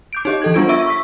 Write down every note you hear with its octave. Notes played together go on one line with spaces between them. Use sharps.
D6 G6 D7
D#4 G4 D#5
E3 A4 G#6
G3 B3 D4 F4 G#6 D7
F4 E5 C#6 E6
C#6 E6 B6